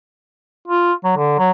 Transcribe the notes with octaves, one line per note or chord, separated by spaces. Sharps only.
F4
F#3
D3
F#3